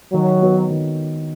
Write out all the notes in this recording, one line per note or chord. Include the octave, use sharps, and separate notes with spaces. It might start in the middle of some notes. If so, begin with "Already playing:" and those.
D#3 F#3
B3 F#4 C#5
D#3